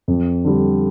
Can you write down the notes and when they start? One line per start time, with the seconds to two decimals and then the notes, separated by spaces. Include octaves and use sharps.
0.08 F2
0.45 D3 G3